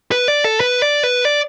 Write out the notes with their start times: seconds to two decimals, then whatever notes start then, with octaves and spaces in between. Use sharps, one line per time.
0.12 B4
0.28 D5
0.44 A4
0.60 B4
0.82 D5
1.04 B4
1.25 D5